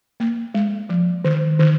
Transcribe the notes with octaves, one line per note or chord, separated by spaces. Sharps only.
A#3
G#3
F3
D#3
D#3